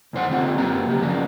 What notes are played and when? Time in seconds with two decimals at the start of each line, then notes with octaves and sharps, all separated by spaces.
0.13 C2 F2 C5 F#5
0.29 D3 G3 C4 F4 C5
0.58 F#2 F#3 A#3 B3 G4 A#5
0.88 C#3 G4
1.02 F3 G3 A#3 B3 C#4